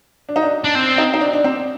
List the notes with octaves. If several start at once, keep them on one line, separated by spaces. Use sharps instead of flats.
D4
D#4
D4
D4
C4
D#4
D#4
D4
D4
C4